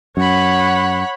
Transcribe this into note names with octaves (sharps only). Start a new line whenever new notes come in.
F#2 C#5 F#5 B5